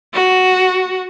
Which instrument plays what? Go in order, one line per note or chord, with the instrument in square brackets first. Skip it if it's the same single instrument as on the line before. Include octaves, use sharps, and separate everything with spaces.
[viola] F#4